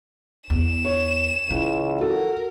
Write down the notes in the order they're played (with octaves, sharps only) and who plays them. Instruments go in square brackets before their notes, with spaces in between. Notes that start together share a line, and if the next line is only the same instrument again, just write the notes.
[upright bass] E2 [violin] E7
[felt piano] C#5
[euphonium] C#2 [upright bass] E3
[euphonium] F#4 [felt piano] A4 [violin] A#4